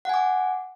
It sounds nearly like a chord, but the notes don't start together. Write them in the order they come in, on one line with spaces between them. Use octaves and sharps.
F#5 G#5 D6